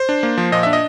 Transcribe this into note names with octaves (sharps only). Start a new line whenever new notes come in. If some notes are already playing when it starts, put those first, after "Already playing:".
Already playing: C5
D4
A#3
F3
A#2 D#5
D4 E5
D#5